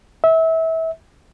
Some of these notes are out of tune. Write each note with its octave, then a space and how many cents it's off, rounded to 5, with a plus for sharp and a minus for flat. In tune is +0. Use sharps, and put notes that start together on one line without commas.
E5 -25